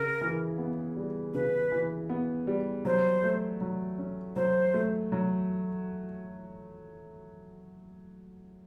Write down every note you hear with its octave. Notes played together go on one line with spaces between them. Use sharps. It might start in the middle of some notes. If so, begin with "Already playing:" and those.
Already playing: C#3 A#4
E3
B3
G3
C#3 B4
E3
B3
G3
F#3 C5
A3
F#3
C#4
F#3 C5
A3
F#3